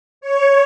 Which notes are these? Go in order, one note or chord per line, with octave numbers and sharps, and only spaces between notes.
C#5